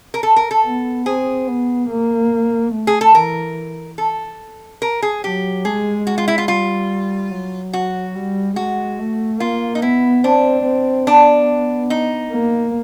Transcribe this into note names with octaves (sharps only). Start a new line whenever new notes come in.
A#4
A4
A#4
A4
B3
C4 G#4
B3
A#3
A3
G#4
A4
E3 A#4
A4
A#4
G#4
F#3 G4
G#3 G#4
F#4
F4
E4
F4
G3 F4
F#3
F#4
G3
G#3 F#4
A3
A#3 F4
D#4
B3 E4
C4 D4
C4
B3 D4
D#4
A#3